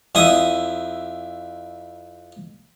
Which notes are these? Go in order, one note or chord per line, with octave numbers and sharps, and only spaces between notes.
F2 E4 D#6